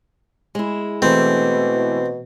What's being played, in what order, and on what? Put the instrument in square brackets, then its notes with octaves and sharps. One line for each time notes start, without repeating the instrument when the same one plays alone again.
[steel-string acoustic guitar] G#3 E4
[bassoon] B2 [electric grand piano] E3 A3 [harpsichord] C4